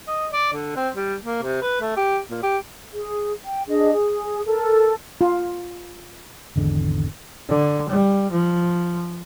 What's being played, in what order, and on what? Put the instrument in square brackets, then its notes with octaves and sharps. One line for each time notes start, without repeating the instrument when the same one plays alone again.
[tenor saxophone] D#5
D5
D3
C4
G3
A#3
C3
B4
A3
G4
A#2
G4
[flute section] G#4
G5
D4 G#4 D#5
G#4
A4 A#4
[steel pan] F4
[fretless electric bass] G#1 E2 D3 G#3
[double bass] D3
G3
F3